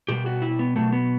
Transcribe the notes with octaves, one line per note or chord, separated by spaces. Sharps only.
B2 G3 G4
F#4
E4
B3
B2 F#3 A3
B3